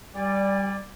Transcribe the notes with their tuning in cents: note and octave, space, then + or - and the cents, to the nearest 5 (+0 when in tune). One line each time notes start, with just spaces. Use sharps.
G3 +0 D5 +0 G#5 -45